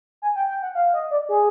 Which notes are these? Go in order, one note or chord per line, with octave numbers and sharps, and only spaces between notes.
G#5
G5
G5
F#5
F5
D#5
D5
G#4